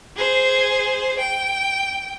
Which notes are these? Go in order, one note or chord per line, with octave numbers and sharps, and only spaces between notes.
G#4 C5
G5